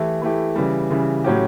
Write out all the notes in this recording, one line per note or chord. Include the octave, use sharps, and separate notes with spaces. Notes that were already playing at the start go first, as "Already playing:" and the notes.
Already playing: E3 A3 E4 G4
E3 A3 E4 G4
C#3 E3 G3
C#3 E3 G3
A2 F#3 C#4 G4